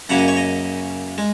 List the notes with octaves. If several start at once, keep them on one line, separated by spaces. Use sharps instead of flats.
F#2 C#3 A#3 C#4 F#5
D#5
C#5
D#5
G#3